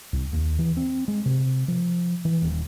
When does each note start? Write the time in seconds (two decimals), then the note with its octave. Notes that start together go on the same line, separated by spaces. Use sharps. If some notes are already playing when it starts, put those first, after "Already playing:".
0.13 C2
0.33 D#2
0.59 E3
0.77 C4
1.08 G#3
1.26 C3
1.68 F3
2.25 E3
2.42 D#1